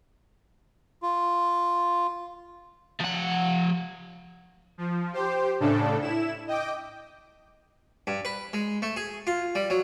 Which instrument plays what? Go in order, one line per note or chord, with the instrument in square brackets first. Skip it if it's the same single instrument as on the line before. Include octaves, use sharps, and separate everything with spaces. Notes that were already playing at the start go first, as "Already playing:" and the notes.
[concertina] F4
[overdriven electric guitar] F3 F#5
[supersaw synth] F3
G4 C5
A2 C#3 D4 A4
E4 E7
D#5 G5 D6
[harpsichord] G2
B4
G#3
A3
G#4
F4
G3
F#3